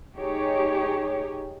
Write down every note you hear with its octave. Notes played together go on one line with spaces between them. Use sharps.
D#4 G4 G#4 C#5